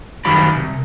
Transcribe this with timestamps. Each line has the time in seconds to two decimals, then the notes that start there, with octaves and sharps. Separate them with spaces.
0.25 F#2 D#3 G3 F4 D5 B5
0.55 C2